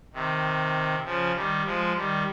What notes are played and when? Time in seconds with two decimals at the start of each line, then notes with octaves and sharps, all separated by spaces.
0.14 C3 D#3
1.05 C#3 F3
1.35 D#3 G3
1.65 F3 G#3
1.96 D#3 G3